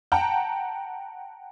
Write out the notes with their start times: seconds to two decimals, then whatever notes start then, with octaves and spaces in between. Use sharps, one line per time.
0.12 F#5 G5 A5 A#5